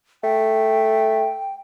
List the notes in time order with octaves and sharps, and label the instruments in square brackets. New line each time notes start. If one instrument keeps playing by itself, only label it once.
[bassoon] A3 [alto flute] G5